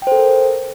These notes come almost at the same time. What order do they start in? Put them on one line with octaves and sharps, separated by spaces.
G5 C5 A4 A#4